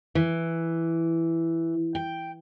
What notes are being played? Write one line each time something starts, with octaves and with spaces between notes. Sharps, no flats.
E3
G5